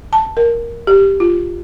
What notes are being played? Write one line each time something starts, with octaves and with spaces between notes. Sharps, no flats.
A5
A#4
G4
F4